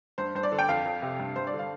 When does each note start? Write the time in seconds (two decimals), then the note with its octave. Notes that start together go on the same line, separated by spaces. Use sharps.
0.18 G2 C5
0.35 G2 C5
0.43 D5
0.52 D3
0.59 G5
0.69 F2 F5
0.86 F2
1.02 C3
1.20 G2
1.36 G2 C5
1.47 D5
1.53 D3
1.59 F5